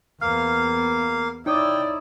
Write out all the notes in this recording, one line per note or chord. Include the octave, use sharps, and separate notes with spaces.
E2 A#3 B3 F5 F6
D#4 E4 C#5 D5 G5 D#6